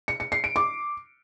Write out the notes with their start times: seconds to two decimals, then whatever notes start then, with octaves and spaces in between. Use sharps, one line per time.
0.08 C#7
0.20 C#7
0.32 C7
0.44 D7
0.56 D6